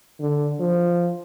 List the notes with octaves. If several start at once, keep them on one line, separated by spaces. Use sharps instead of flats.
D3
F3